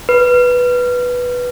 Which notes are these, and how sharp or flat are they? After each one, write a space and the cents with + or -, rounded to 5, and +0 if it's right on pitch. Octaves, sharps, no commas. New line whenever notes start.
B4 -5